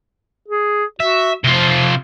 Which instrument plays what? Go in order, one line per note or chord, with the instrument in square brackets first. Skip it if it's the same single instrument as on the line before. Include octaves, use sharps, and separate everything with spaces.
[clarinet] G#4
[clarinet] F#4 [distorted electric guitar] E5
[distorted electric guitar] C3 F4 [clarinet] F3